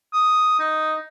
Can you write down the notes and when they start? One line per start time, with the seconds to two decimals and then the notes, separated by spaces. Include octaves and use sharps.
0.13 D#6
0.60 D#4